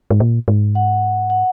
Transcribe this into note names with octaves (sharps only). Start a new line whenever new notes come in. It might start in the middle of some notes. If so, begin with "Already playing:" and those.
G#2
A#2
G#2
F#5
F#5